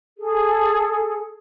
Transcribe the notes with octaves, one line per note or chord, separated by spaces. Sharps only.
G#4 A4